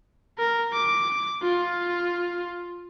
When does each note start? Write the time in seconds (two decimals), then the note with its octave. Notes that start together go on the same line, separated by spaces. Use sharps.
0.38 A#4
0.73 D6
1.43 F4